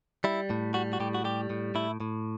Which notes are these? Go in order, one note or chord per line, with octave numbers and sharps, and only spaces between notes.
G3 E4
A2
G3 F#4
F#4
A2 G4
F#4
G3 G4
A2
A2 E4
A2